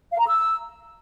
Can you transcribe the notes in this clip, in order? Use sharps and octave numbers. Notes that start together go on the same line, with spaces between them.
F5
A#5
E6